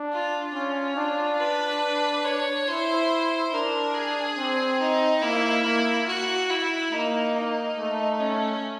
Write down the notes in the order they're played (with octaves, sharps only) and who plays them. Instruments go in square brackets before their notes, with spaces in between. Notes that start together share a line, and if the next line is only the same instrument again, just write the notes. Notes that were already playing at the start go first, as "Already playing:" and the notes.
Already playing: [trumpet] D4
[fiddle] F4
[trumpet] C#4 [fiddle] F4
[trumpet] D4
[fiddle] B4
C#5
[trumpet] E4 [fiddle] C5
[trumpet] D4 [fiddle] A#4
[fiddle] G#4
[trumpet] C4
[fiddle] D#4
[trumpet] A#3 [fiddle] E4
[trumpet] A#3 [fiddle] E4
[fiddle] F#4
E4
[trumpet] A#3 [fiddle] D#4
[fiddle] D#4
[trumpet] A3
[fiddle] C#4